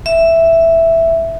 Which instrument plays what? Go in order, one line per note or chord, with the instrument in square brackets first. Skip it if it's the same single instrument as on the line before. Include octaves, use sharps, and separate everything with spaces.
[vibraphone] E5